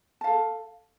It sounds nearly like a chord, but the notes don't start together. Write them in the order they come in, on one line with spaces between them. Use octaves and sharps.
A5 F5 A4